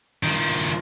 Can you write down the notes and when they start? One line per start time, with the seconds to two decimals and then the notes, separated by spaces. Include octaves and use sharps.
0.23 D#3 F3